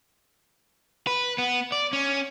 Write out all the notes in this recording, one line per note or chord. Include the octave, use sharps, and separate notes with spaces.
B4
B3
D5
C#4